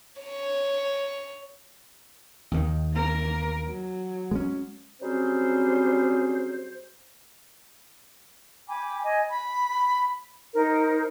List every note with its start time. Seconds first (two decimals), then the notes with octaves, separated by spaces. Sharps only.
0.22 C#5
2.51 D#2 D#3
2.93 A#3 A#4
3.65 F#3
4.31 G#3 C#4
5.01 F#3 G3 C4 C#4 G#4 C5
8.69 G5 G#5 B5 D6
9.03 D#5 G#5
9.29 B5
10.54 D#4 A#4 C5